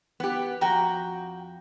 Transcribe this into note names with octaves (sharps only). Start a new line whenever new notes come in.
B3 G4
F2 F#4 G5 A#5